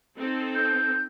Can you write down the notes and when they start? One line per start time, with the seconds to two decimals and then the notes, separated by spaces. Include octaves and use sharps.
0.17 C4 D#4 A4
0.55 G6